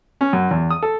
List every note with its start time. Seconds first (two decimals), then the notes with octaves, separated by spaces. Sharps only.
0.21 C#4
0.33 F#2
0.51 E2
0.70 D#6
0.83 A4